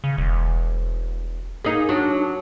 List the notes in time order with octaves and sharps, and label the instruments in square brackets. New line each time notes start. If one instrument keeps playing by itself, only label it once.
[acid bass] C#3
E1
[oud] A#3 D#4 [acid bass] G#4
[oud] F#3 [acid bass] D4